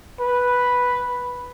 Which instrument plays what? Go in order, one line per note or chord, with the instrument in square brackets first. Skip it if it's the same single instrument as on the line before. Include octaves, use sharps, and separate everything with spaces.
[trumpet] B4